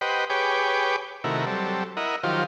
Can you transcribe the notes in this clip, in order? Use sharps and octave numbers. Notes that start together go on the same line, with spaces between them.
G4 B4 C5 D#5 F#5 G5
G4 G#4 B4 C#5 G5 D6
C3 D#3 A3 E4 F#4 A#4
F#3 G3 C4 A4
E4 A#4 D#5 F#5
D#3 F3 F#3 F4 G4 C5